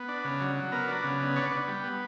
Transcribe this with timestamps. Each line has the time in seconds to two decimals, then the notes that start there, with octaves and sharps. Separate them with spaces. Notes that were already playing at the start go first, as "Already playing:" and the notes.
Already playing: B3
0.08 D4
0.24 C#3
0.41 F#3
0.56 F#3
0.72 B3 A#4
0.88 D4
1.04 C#3
1.20 B3
1.36 D4 C#5
1.52 B3
1.68 G3
1.84 B3